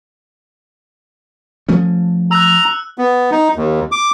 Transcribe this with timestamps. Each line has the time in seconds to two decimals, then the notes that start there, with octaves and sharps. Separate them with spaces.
1.69 F3 A3 C#4
2.31 A#5 E6 F#6
2.98 B3
3.32 D#4
3.56 D#2
3.92 D6